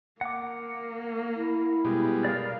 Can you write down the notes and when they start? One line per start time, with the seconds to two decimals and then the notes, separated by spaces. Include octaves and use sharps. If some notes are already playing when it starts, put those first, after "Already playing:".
0.21 A#3 F#5 D6
1.36 E4
1.85 B2 G3 G#3
2.25 A#4 D5 F5